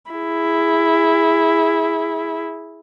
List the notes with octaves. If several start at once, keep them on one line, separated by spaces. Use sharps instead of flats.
E4 G#4